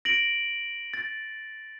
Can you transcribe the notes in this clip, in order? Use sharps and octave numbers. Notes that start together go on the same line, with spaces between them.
A#6 D7 F#7
A6